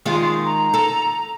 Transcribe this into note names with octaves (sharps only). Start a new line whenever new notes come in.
D#3 G#3 F4
A#5
A4